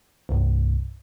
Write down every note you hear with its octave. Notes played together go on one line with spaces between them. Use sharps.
C2 G2